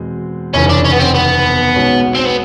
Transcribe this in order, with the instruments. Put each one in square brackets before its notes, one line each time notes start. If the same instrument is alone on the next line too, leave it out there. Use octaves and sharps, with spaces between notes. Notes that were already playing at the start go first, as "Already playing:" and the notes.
Already playing: [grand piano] E2 B2 G#3 C4
[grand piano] F1 D#2 C#3 E3 [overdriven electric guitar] C#4
[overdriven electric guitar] D4
C#4
B3
C4
B3
[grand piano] B1 B2 G#3 C#4
[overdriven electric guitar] C4
B3